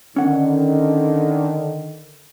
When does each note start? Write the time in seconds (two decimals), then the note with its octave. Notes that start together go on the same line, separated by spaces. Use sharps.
0.16 D3 D#3 C#4 F#5